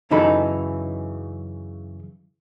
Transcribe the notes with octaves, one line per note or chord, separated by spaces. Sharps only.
F#2 C#3 E3 D#4 A4 B5